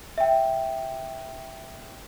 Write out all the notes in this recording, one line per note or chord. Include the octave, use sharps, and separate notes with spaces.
E5 G5